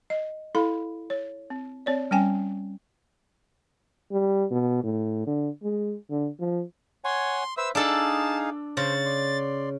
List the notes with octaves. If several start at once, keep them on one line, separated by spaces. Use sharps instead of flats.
D#5
E4 A4 F5 B5
C#5
C4
C4 C#5 D5
G3 C#4 G5 G#5
G3
B2
A2
D3
G#3
D3
F3
C#5 F#5 G#5 C6
B4 C5 E5 E6
D4 D#4 G#4 A4 F5 A5
C#3 C5 A6
D5 C6